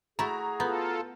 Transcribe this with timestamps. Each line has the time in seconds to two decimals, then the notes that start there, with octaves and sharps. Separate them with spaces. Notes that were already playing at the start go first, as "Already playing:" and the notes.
0.19 A3 E4 F#4 G#4 A#5
0.60 B3 F4 A4 A#5 G6